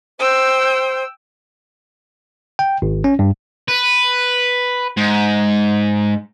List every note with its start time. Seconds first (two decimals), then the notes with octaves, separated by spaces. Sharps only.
0.19 C5 G5 E6
2.59 G5
2.82 G#1
3.04 C#4
3.19 G2
3.68 B4
4.97 G#2